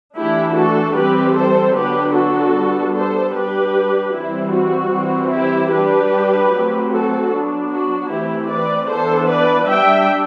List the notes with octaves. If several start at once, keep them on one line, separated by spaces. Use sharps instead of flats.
E3 A3 D4 E4 G4
F#4 A4
E3 G3 C4 G4 B4
A4 C5
D3 F#3 B3 D4 G4 B4
F#4 A4
G3 B3 D4
A4 C5
G3 D4 G4 B4
E3 G3 C4 E4
F#4
E3 G3 C4
E4 G4
G3 D4 G4 B4
F#3 A3 C4
F#4 A4
F#3 B3 D4
F#4
E3 A3 C4 E4 G4
B4 D5
E3 B3 D4 A4 C5
B4 D5
G3 D4 E5 G5